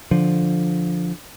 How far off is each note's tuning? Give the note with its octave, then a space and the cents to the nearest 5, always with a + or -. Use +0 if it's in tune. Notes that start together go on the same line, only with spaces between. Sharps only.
D3 +0 F3 +0